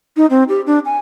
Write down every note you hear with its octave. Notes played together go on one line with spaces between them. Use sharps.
D#4
C4
G4
D4
G#5